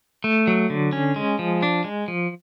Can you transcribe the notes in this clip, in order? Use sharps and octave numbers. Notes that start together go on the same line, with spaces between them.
A3
F#3
D3
C#4
G#3
F3
D4
G#3
F3